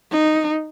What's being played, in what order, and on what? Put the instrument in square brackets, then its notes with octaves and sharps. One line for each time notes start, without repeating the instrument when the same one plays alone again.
[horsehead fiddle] D#4